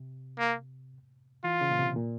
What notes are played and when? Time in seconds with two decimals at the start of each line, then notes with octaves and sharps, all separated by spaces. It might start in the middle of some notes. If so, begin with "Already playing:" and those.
Already playing: C3
0.39 A#3
1.44 E3 F4
1.61 C#3
1.70 A#2
1.79 C3
1.96 A#2